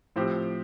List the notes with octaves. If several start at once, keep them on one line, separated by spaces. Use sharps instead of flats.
A2 F3 C4 G4